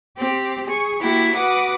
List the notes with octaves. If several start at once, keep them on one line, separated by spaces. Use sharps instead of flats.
C4 G4
G#4 C#6
A#3 E4 F#4 G4
F#4 B4 F#5 D6 D#6